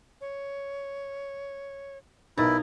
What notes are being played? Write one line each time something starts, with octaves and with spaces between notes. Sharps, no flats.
C#5
B1 D#4 E4 A#4 B4 A6